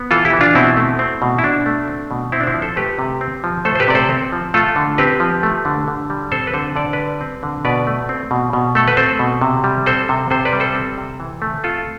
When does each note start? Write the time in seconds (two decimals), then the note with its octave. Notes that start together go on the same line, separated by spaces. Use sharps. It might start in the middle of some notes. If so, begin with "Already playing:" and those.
Already playing: B3
0.11 E3 F4 A4
0.25 E4 G4
0.33 E3
0.41 D4 F4
0.55 B2 C4 E4
0.77 A3
0.99 C4
1.22 B2
1.39 E4
1.43 B2 D4
1.66 A3
1.88 C4
2.11 B2
2.32 C4 E4
2.40 D4
2.47 C4 E4
2.54 F3
2.62 A4 C5
2.76 A3 G4 B4
2.99 C3
3.21 C4
3.44 F3
3.65 A3 A4 C5
3.75 C5
3.80 G4 B4
3.88 C3 D5
3.95 A4 C5
4.10 C4
4.33 F3
4.54 A3 F4 A4
4.76 D3
4.98 C4 G4 B4
5.20 F3
5.43 A3
5.65 D3
5.88 D3
6.10 G3
6.32 C4 A4 C5
6.47 B4
6.54 D3 A4 C5
6.76 D3 D5
6.93 G3 B4 D5
7.21 C4
7.43 D3
7.65 B2 B4 D5
7.87 A3
8.09 C4
8.31 B2
8.53 B2
8.75 A3 A4
8.88 B4
8.97 C4 A4 C5
9.19 B2
9.41 C3
9.64 G3
9.86 C4 A4 C5
10.09 C3
10.30 C3 A4 C5
10.45 B4 D5
10.53 G3
10.60 A4 C5
10.75 C4
10.98 C3
11.20 E3
11.42 A3
11.64 C4 F4 A4